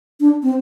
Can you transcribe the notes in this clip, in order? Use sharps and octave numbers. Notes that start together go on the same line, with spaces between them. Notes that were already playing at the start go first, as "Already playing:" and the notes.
D4
C4